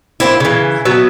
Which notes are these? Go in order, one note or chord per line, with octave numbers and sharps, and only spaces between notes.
A#3 C4 E4
C#3 E3
F#3 B3 E5